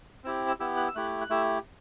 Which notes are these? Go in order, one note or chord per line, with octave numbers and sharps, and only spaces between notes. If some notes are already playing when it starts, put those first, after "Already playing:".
C4 E4 G4 E6
E6
B3 E4 G4 E6
F#6
E6
A3 E4 G4 F#6
F#6
A3 E4 G4 E6